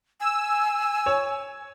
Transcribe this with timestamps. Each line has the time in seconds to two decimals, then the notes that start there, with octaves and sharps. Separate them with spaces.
0.20 G#5 E6
1.06 C#5